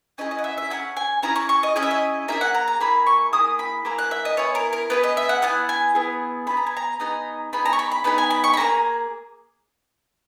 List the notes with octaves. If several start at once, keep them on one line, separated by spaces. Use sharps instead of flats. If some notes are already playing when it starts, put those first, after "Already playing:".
C#4 E4 G#4 D#5
D#5
F#5
E5
E5
C#4 E4 G#4 F#5
G#5
C#4 E4 G#4 A#5
C#6
C#6
D#5
C#4 E4 G#4 D#5
E5
D#5
A#3 E4 G#4 E5
F#5
A#5
A#5
A#3 E4 G#4 B5
C#6
A#3 E4 G#4 D#6
B5
A#3 E4 G#4 A#5
F#5
E5
D#5
B3 E4 G#4 C#5
A#4
A#4
B3 E4 G#4 B4
D#5
E5
F#5
B3 E4 G#4 F#5
G#5
B3 E4 G#4
B3 D#4 G#4 B5
A#5
G#5
A#5
B3 D#4 G#4 A#5
B3 D#4 G#4 B5
A#5
C#6
B5
B5
B3 D#4 G#4 B5
G#5
B5
C#6
B5
A#3 E4 G#4 A#5